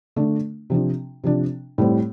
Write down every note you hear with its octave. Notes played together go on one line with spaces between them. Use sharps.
D3 A3 D4
C3 F3 D4
C3 F3 D4
A2 G3 C4